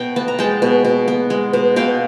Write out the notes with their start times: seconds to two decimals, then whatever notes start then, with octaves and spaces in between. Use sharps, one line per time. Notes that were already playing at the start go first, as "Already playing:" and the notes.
Already playing: B2 G5
0.16 B3 A5
0.28 A#5
0.39 G#3 G5 A5
0.62 B2
0.85 B2
1.08 B3
1.30 G#3
1.53 B2
1.76 B2 F5 G5